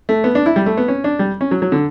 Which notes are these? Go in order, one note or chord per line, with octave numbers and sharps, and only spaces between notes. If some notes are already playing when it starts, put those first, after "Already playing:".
A3
B3
D4
E4
G3
A3
B3
C#4
D4
G3
C#4
F#3
F#3
D3